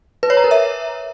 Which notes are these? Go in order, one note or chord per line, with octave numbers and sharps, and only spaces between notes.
B4
C#5
A#5
A#4
E5